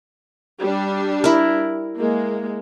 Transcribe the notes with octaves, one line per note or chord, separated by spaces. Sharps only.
G3 D4
E4 A#4
G#3 A#3